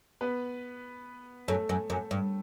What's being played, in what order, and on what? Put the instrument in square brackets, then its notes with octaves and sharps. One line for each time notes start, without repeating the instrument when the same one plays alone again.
[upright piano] B3 B4
[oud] F#2 [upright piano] A3 A4
[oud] F#2
F#2
G2